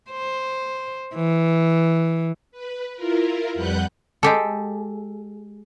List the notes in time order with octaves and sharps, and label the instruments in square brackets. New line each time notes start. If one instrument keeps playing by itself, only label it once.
[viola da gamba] C5
E3
[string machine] B4
E4 F4 A#4
F2 G3 B4 F#5 F#6 G6
[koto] G#3 G4 A4